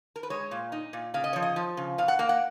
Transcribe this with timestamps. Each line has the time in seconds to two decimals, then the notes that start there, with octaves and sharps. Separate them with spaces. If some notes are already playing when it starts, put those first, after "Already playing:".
0.16 A#4
0.23 B4
0.30 G#3 C#5
0.51 A#2
0.72 D#4
0.93 A#2
1.14 C#3 F5
1.24 D#5
1.33 F3 C#5
1.42 D#5
1.56 F3
1.77 C#3
1.98 B2 F5
2.08 F#5
2.19 A#3 F5
2.29 F#5